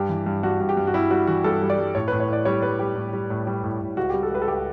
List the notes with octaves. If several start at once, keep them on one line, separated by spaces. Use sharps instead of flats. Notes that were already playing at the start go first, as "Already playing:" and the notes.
Already playing: G2 G4
E3
G2
G2 F#4
G2
G4
G2
F#4
G3 E4
G3 F#4
E3 F#4
G2 A4
G3
D5
G3
A2 C#5
A2 B4
C#5
A2 D5
G3 C#5
G3 B4
G3 G4
A2
G3
A2
G3
A2
A2
C#2 F#4
G3 G4
A4
C#2 B4
A4
C#2 G4